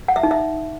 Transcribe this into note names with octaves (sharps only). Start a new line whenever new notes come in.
F#5
E5
D#4
E5